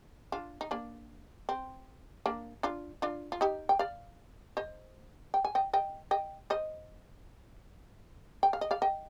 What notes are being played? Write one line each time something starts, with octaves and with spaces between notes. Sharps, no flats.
D4 F4
D#4
A#3 D4
C4
A#3 D4
D4 F4
D4 F4
F4
D#4 G4
G5
D5 F5
C5 D#5
G5
G#5
D#5 G5
D#5 G5
D#5 G5
C5 D#5
G5
F5
D#5
D5 F5
D#5 G5